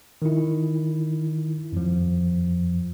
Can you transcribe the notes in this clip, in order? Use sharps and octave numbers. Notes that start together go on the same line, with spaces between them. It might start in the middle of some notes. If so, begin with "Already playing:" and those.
D#3 E4
F2 F3